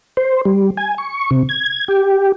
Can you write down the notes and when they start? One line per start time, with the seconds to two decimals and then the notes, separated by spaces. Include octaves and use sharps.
0.17 C5
0.45 G3
0.77 G#5
0.98 C#6
1.31 C3
1.49 G#6
1.88 G4